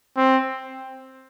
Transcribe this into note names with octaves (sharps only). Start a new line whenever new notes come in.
C4